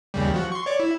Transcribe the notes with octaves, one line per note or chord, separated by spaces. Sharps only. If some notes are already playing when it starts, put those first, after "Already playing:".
D#2 C#3 G3
F3 F#4
C6 C#6
C#5 D5
E4